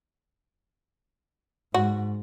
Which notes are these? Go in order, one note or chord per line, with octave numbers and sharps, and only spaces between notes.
G#2 F#4